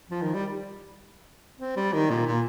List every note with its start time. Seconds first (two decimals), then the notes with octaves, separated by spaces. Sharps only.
0.10 F3
0.22 D#3
0.34 G3
1.60 C4
1.76 G3
1.93 D#3
2.10 A#2
2.26 A#2